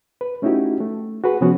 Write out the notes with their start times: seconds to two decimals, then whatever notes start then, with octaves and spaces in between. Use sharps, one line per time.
0.21 B4
0.42 A3 C#4 D#4 E4 F#4 G4
0.80 A3
1.24 F#4 G#4 B4
1.41 C3 F3 B3 C#4 F#4